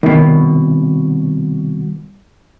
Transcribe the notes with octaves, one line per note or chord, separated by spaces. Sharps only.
C2 B2 D#3